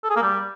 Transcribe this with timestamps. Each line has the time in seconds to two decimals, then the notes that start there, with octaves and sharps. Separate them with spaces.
0.04 A4
0.10 G#4
0.16 A#3
0.22 G3